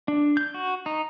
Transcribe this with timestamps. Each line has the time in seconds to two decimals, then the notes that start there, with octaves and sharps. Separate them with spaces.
0.08 D4
0.37 G6
0.54 F#4
0.86 D#4